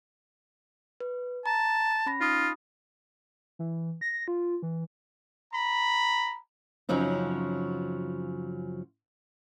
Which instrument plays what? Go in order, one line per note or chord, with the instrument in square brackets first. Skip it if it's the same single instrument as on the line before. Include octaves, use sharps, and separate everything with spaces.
[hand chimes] B4
[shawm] A5 [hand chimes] A#5
[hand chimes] C#4 B5 A#6
[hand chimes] D#4 B5 D#6 [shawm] F4
[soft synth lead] E3
A#6
F4
E3
[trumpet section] A#5 B5
[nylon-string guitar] F#2 C#3 F3 F#3 C4 D#4